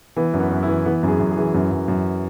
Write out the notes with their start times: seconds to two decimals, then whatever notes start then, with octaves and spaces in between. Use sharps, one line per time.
0.16 E3 B3
0.34 F#2
0.40 B3
0.51 F#2
0.63 E4
0.68 E3
0.85 E3 B3
1.03 F#2
1.08 G#4
1.20 F#2
1.31 G#4
1.37 E3
1.54 F#2
1.71 F#2
1.88 F#2